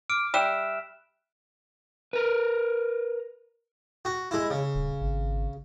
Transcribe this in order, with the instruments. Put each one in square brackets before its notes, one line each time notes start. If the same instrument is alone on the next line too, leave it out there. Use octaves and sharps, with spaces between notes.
[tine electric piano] D6 [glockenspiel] F6 D7
[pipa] G3 [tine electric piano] E5 [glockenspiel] E6 F#6 E7
[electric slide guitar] A#4 B4
[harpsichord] F#4
G#3 E4
C#3
[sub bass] D#1
G#1